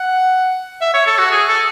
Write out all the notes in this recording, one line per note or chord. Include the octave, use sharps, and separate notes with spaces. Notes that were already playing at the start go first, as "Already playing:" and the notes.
Already playing: F#5
E5
C#5
A4
F#4
G#4
A4